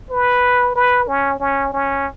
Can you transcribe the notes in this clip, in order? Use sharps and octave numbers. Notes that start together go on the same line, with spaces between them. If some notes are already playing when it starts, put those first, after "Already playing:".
B4
B4
C#4
C#4
C#4